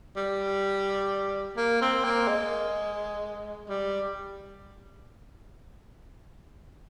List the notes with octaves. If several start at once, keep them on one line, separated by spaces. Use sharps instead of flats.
G3
A#3
C4
A#3
G#3
G3